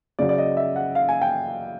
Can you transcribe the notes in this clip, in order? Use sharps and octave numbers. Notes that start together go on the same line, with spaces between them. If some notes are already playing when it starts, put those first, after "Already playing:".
C#3 F#3 D5
D5
D#5
E5
F#5
F5
G#5
G5